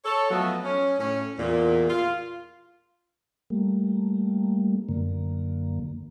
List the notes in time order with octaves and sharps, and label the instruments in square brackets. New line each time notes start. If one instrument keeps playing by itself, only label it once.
[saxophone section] A4 C#5
F3 F#3 A3 B3 F#4 D#5
C#4
A2 C#4
E2 A#2
F4
[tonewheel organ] G3 A3 A#3
F#2 D3 A#3